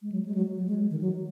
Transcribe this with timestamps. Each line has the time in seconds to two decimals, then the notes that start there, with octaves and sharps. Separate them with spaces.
0.02 G#3
0.12 F#3
0.26 G#3
0.35 F#3
0.57 F#3
0.68 G#3
0.91 D#3
1.01 F#3